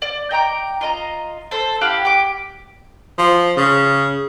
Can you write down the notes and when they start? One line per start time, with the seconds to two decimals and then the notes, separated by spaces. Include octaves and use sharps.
0.02 D5
0.31 D#5 G5 A#5 D6
0.81 F4 D#5 A#5
1.51 A4 C5
1.81 E4 G4 F5 F#5
2.05 G4 D6
3.18 F3
3.57 C#3